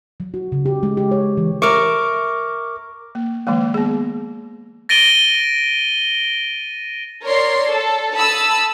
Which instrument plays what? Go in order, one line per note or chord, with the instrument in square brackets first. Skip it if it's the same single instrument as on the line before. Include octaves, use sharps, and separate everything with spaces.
[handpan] F#3
F#4
C#3
G4
G#3
G4
C#5
E3
[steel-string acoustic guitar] A#4 E5 [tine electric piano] C#6 D6 F6
[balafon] A#3
D#3 F3 G#3 A#3
B3 G#4
[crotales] A6 A#6 D7 D#7 G7
[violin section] A#4 C#5 D5 C6
A4
A4 A5 B5 D#6 E6